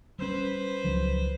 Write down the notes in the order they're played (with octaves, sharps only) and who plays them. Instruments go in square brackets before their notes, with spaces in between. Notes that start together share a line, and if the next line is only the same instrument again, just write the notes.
[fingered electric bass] G3 C#4 [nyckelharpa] B4 C5
[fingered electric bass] C#2 F3 F#3